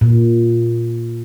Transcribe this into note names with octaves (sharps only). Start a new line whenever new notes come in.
A#2